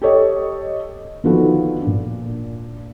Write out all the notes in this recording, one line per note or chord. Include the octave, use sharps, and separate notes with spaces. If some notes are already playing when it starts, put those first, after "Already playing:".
G4 A4 C#5 D#5
D3 D#3 F3 B3 F#4 A4
A#2 D4